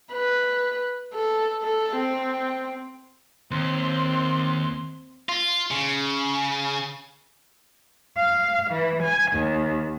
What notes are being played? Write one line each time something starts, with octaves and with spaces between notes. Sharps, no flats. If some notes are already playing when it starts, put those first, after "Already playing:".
B4
A4
A4
C4
D#2 C4 C6
F4
C#3
F5
E3
G#5
D#2